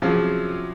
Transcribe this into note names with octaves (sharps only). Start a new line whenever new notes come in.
C3 F3 F#3 C#4 G#4